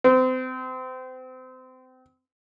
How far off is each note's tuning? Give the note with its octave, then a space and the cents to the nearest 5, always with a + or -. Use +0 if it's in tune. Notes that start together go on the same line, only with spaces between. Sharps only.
C4 -30